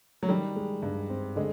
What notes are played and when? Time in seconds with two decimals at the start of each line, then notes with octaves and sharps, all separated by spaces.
0.23 F#3
0.29 D#3 G3
0.56 G#3
0.83 G2
1.10 C4
1.36 D3 G#3